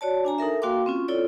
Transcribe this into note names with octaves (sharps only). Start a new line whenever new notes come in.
F#4 C#5 D5 A5
D4 G#5 A#5
D#4 A4 A#4 E5
A#3 F#4 F5 G5 C6 D6
C4 C#4 F4
E4 F4 A4 C#5 D5